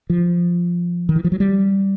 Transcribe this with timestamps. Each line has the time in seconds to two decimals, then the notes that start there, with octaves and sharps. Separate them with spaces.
0.10 F3
1.09 D#3
1.16 E3
1.24 F3
1.32 F#3
1.40 G3